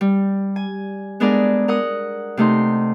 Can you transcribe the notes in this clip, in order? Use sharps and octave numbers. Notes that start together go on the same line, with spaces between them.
G3
G#5
G#3 B3 D4 G#4 A#4 D5
A#4 F#5 D#6
C3 A3 D#4 C6